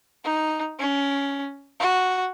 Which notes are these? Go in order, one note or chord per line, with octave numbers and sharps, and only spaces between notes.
D#4
C#4
F#4